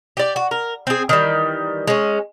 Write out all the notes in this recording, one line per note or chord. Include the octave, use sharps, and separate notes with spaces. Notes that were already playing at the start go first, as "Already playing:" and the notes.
G4 D5
F#4
A#4
C4 G#4
D#3 E3 G3
G#3 C#4